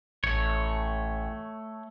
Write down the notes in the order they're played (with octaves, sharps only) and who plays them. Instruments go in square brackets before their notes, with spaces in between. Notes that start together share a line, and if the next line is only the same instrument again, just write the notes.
[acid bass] A1 [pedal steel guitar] A3 C#5